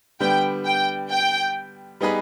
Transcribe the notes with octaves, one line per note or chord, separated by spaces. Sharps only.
D3 G3 B3 G5
G5
G5
G3 B3 D#4 G#4 B4